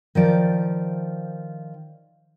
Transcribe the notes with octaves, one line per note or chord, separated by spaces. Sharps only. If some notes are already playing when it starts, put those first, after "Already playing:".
D#3 F3 D5